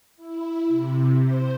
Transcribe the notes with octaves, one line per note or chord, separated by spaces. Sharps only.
E4
C3
C5